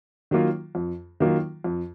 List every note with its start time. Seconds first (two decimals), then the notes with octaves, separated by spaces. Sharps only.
0.31 D#3 F#3 A#3 F4
0.75 F2
1.20 D#3 F#3 A#3 F4
1.64 F2